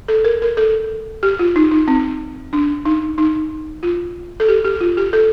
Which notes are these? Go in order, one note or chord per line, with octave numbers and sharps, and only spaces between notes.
A4
A#4
A#4
A4
G4
F4
D#4
D#4
C4
D4
D#4
D#4
F4
A4
G4
G4
F4
G4
A4